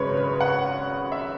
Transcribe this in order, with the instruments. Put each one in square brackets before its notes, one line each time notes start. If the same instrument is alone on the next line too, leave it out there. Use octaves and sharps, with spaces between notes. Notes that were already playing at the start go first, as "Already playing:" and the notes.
Already playing: [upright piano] G#1 F#2 C#3 G#3 B4 C#5
B4
F#5
E5